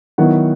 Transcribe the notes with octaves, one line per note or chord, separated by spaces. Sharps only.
D#3 F#3 B3 E4 F#4 F#5